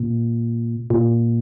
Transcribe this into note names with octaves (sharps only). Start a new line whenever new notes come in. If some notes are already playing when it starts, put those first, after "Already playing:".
Already playing: A#2
A#2